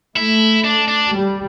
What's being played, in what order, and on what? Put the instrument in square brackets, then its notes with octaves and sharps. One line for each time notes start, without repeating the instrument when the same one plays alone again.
[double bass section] A3 [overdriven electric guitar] E4
[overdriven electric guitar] D4
D4
[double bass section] G3